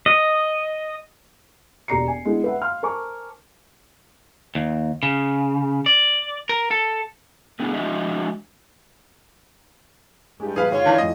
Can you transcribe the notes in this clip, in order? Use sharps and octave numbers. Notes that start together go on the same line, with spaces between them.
D#5
E1 G4 D5 A#5 C7 C#7
G#5
G#3 B3 D4 E4 G#4
B4 E5 F#5
F5 C6 F6
A#4 C5 G#5 A5 C#6 D6
D#2
C#3
D5
A#4
A4
A3 B3 D4 G4 G#4
F3 G#3 D4 F#4 D#5 E5
G2 G#3 G4
A#1 G#4 B4 F5
G#1 F4 C#5
D#3 E3 D4 D5 A5
F2 A2 F3 D#5